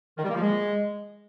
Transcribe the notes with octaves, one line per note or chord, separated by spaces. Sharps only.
D#3
G3
A#3
F3
G#3